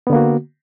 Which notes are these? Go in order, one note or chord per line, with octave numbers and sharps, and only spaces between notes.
D3 A#3 B3 F#4